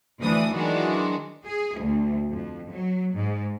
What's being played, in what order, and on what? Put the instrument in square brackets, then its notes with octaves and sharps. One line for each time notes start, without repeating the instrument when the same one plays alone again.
[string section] D2 E3 F3 D4 D5 D#6
D#3 E3 F#3 G#3 D4 F#4
[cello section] G#4
D2
F2
F#3
G#2